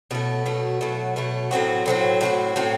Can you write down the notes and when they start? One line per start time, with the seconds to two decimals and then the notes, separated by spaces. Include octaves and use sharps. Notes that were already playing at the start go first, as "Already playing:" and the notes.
0.11 B2 F#3 A3
0.45 B2 F#3 A3
0.81 B2 F#3 A3
1.16 B2 F#3 A3
1.51 A2 F#3 C4 F#4
1.86 A2 F#3 C4 F#4
2.21 A2 F#3 C4 F#4
2.56 A2 F#3 C4 F#4